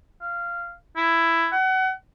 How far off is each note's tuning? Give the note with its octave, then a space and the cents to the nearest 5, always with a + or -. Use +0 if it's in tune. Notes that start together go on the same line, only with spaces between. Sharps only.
F5 -15
E4 +10
F#5 +30